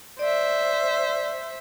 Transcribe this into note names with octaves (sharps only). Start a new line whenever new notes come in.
C5 D5 E5